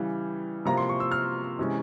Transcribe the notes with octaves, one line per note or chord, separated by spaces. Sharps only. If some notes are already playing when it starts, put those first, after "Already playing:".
Already playing: C#3 E3 G3
C3 F3 A#3 E4 A#5
C6
C#6
E6
F6
C3 E3 G#3 C#4